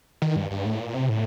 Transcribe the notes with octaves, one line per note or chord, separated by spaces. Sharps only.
D#3
G2
G2
A2
A#2
C3
A2